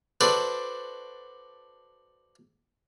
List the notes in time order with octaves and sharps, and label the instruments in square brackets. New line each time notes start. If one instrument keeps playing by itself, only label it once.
[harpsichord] D4 F#4 A4 B4 C5 D5